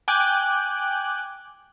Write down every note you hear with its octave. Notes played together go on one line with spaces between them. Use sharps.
G5 G#5 D6 F#6 G6